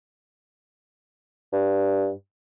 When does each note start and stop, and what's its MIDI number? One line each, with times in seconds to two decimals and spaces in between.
1.53 2.11 43